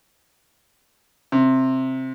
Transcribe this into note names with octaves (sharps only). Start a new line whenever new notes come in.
C3